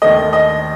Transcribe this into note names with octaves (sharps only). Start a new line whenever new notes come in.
D#2 D#3 A3 D#5
D#5